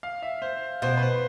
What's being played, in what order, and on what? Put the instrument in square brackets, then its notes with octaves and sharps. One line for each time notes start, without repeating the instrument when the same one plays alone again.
[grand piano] F5
E5
C5
[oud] B2 [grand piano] C5
[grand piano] B4
C5